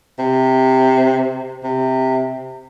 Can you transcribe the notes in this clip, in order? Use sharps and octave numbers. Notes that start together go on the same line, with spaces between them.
C3
C3